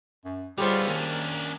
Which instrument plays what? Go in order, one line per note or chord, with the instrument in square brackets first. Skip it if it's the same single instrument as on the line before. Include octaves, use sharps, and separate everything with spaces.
[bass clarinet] F#2
[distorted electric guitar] D3 B3 [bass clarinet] G3 [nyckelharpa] F4 C#5 [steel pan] G4 G#4 C5
[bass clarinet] D#3 [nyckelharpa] A#3 [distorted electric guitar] C#4 D4